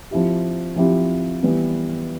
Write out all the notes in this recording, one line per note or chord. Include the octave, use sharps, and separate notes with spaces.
F3 C4 E4 G4
F3 C4 E4 G4
E3 G3 B3